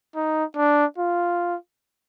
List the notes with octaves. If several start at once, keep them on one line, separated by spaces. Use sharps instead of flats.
D#4
D4
F4